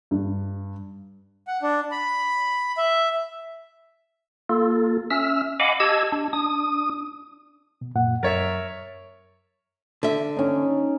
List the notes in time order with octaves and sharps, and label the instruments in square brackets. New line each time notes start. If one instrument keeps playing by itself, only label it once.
[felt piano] G2
[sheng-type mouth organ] F#5
D4
B5
E5
[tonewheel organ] A#3 F4 A4
C#4 E5 E6 F6
D#5 F5 F#5 G#5 B5 D6
G4 D#5 A5 E6 G#6
D4
D4 D#6
[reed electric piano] B2
F#2 A#2 F#5
[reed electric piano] F#2 A6 [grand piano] A#4 C#5 E5
[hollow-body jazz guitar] D3 E5
[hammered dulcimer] C#4 D#4